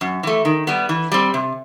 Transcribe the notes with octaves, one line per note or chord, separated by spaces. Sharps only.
F#2
E3 A3
D#3
G3 B3
E3
G3 C4
C3